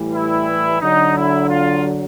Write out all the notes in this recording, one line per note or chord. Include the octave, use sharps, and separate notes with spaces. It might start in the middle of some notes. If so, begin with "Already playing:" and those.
Already playing: A2 E3 G3
E4
D3 F#3 D#4
E4
F4